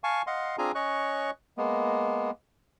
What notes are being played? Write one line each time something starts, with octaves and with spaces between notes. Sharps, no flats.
F5 G#5 A5 C#6
D#5 F5 F#5 C6
C4 D4 F4 G#4 G#5 A#5
C#4 C#5 D#5 C#6 F#6
G#3 A#3 B3